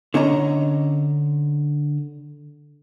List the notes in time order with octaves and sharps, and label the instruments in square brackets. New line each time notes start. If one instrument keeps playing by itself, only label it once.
[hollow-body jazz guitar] D3 C#4 D#5 A#5